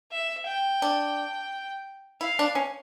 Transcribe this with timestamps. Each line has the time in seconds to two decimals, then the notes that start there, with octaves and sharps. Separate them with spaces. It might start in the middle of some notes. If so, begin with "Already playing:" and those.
0.12 E5
0.47 G5
0.82 D4
2.21 E4 F5
2.39 D4
2.55 C#4